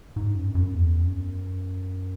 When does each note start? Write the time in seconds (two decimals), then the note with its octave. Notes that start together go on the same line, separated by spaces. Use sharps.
0.16 G#2
0.35 F#2
0.55 F#2
0.74 E2
1.03 F#2